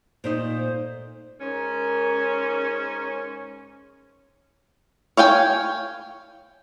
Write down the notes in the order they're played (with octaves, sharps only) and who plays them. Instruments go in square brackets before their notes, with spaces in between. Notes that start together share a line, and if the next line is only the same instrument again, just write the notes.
[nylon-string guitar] A#2 A3 D#4 [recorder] C5
[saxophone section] G#2 C#4 [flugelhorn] A#4
[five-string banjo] C#5 F5 G5 G#5